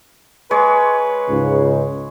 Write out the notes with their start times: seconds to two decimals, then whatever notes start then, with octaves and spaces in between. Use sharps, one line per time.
0.51 G#3 B4 C#5
1.29 C#2 G#2 C#3